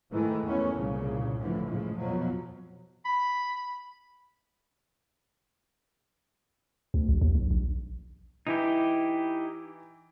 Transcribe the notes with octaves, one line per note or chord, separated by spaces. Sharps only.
G#2 D#3 E3 G#3 A3
E2 D#3 A3 B3 C#4
C2 G2 A#2 C#3
A2 D3 E3 F3
A2 C#3 F3 G#3
F2 B2 F3 F#3
B5
D2
A#1
D#2
B1
A#1
E3 D#4 E4 G4